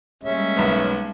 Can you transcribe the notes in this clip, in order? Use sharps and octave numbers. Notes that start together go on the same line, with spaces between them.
G3 G#3 A#3 C#4 E5
B1 B3